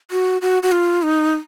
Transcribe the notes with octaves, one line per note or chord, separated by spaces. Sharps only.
F#4
F#4
F#4
F4
D#4